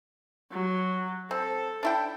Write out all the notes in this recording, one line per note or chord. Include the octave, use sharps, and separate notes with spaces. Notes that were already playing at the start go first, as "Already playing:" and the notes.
F#3
C4 A4
D4 E4 G5